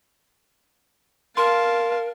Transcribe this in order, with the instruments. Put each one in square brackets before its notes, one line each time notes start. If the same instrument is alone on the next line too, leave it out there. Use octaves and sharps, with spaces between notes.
[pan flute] A#4 [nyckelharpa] F5 A5 [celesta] C6